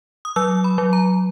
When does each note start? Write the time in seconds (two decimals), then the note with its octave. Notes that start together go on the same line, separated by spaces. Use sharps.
0.25 D#6
0.36 F#3 E6
0.64 B5
0.78 F#3
0.93 A#5